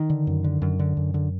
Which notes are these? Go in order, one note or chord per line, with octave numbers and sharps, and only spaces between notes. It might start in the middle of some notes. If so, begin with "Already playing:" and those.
Already playing: D#3
D3
F#2
D3
F#2
D3
F#2
D3